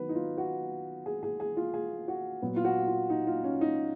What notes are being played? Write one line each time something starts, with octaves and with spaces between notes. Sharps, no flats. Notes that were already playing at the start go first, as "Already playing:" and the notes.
Already playing: D#3 F#3 B3 B4
D#4
F4
F#4
G#4
G#4
G#4
F4
G#4
F#4
A#2 F#3 B3
F4
F#4
F4
D#4
F4
C#4
D#4